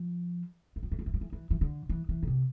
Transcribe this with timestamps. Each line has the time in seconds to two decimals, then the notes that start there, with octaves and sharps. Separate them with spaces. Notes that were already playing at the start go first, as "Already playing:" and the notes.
Already playing: F3
0.76 E3
0.83 F3
0.92 E3
0.99 F3
1.06 E3
1.14 F3
1.21 E3
1.33 E3
1.50 E3
1.61 D3
1.89 E3
2.09 E3
2.23 A#2
2.27 C3